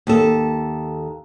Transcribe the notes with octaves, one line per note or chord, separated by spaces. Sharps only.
D#2 A4